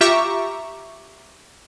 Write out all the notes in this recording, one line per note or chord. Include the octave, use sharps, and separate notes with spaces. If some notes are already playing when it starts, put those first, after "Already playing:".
F4 G4 E5 A#5 C#6 D6